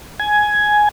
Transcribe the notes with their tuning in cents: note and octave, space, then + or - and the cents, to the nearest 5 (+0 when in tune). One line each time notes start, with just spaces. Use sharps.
G#5 +10